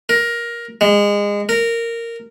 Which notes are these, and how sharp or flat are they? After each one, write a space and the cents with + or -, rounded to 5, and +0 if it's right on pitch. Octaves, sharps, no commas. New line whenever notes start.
A#4 +15
G#3 -25
A#4 -10